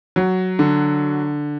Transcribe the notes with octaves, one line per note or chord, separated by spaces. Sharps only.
F#3
D3